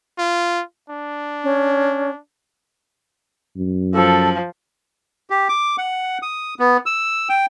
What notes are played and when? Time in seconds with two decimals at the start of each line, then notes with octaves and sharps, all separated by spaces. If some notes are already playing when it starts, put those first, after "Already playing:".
0.18 F4
0.90 D4
1.43 C#4
3.57 F#2
3.95 F3 A4
5.30 G4
5.49 D6
5.78 F#5
6.22 D#6
6.60 B3
6.86 E6
7.29 G5